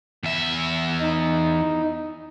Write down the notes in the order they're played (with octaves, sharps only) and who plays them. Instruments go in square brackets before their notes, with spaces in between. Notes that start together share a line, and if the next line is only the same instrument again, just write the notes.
[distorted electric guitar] E2 E5
[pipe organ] D#4